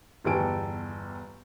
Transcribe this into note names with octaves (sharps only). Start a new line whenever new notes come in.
G1 E2 G4 A4 G#5 D7